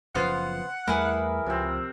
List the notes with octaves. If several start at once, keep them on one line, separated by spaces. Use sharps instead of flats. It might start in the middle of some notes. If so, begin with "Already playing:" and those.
F#1 C#3 F3 B3 C5 F5 F#5
E2 G3 A3 E4 G#4 A#4 B4
C#2 C3 F3 C4